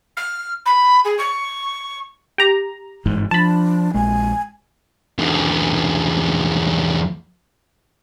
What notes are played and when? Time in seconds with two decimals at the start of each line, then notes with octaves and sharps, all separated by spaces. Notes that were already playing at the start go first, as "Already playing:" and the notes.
0.16 F6
0.65 B5
1.04 G#4
1.18 C#6
2.38 G4 A#5
3.06 G1 G#2 E3
3.31 F3 D4 A5 B5
3.94 A#1 G#3 G#5
5.19 E2 D3